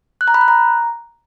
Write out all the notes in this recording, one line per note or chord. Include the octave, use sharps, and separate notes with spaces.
F#6
A#5
B5
F#6
A#5